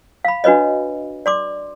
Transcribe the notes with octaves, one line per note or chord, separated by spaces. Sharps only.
F5 B5
D4 F#4 B4 C#5 D#5
D5 C6 D6